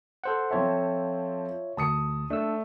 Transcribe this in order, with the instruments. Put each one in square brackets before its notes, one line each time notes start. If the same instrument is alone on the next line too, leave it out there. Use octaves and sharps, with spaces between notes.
[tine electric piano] A4 C5 F#5
[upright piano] F3 C4 A4 [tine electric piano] F4 C#5 E5
[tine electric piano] D2 [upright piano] A5 D#6 C#7
[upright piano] A3 [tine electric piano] D4 E6